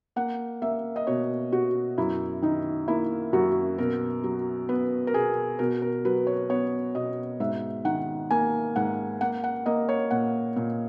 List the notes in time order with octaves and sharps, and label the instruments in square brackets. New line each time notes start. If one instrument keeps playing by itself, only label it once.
[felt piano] A#3 F#5
A#3 E5
D#5
B2 C#5
B2 F#4
F#2 E4
D#3 D#4
A#3 E4
F#2 F#4
B2 A#4
F#3
B3 B4
A#4
B2 G#4
B2 A#4
A#4
F#3 B4
C#5
B3 C#5
B2 D#5
G#2 E5
D#3 F#5
A#3 G#5
G#2 F#5
A#3 F#5
F#5
A#3 D#5
C#5
A#2 F#5
A#2